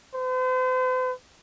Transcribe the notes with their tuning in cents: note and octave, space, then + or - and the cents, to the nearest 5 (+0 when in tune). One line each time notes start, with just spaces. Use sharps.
C5 -45